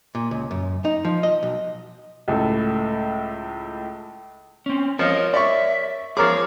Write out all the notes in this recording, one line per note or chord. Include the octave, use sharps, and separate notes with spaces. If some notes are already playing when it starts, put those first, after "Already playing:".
A#2
C#2
F#2
D#4
F3
D#5
B1
C#2 A2 A4
C4 C#4
F3 A#4 C#5 D#5
D5 E5 C#6
F3 G#4 A#4 C#5 D6